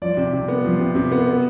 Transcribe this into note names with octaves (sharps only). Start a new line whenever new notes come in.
F3 D5
C3
C3
B3
F3
C3
C3
B3
B3